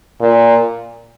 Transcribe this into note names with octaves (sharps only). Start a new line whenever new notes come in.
A#2